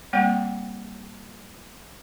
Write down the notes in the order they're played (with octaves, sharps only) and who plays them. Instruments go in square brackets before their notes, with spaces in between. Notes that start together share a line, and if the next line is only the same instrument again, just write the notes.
[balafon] G3 A#3 C4 F#5 G5